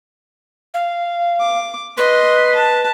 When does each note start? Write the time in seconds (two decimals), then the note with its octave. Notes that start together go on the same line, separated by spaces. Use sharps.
0.74 F5
1.39 D6
1.97 B4 D#5 C6
2.56 A5